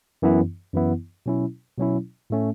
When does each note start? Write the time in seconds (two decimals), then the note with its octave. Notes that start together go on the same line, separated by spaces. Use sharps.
0.22 F#2 E3 B3 E4
0.74 F#2 E3 B3 E4
1.26 B2 F#3 C#4 E4
1.78 B2 F#3 C#4 E4
2.30 A2 A3 C#4